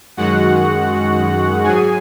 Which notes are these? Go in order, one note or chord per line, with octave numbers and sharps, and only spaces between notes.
F#2 D#3 G#3 F#4 F#5
G#2 F#3 G#4 G#5